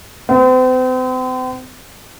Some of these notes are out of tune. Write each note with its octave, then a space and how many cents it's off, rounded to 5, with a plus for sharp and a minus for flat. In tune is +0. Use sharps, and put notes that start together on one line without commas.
C4 -40